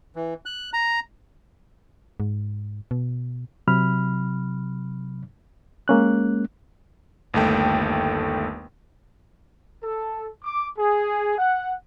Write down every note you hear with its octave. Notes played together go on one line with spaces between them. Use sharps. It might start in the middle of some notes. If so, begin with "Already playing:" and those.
E3
F#6
A#5
G#2
B2
C3 F#3 B5 F6
G#3 A#3 C#4 F#6
G1 D#2 A3 G5
A4
D6
G#4
F#5